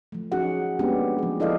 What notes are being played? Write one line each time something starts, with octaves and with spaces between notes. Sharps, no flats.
F3 A3
C#4 D#4 F#4 G#4 F#5
G#3 A#3 B3 C#4 D4 G4
F3 G#4
E4 A4 D5 D#5 F5